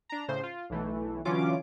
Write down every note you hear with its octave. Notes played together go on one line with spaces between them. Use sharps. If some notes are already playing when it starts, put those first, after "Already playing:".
D4 A#5
A2 C#3 C5
F4
B1 E3 A3
D3 E3 F#3 C#4 F4 D6